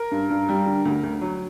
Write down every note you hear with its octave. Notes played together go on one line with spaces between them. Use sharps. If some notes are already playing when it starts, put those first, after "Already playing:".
Already playing: A#4
G2
G2
G3
D3
D2
D2
F#3